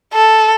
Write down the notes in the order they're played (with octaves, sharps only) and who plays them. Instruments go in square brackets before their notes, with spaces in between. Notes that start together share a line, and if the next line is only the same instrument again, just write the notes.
[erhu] A4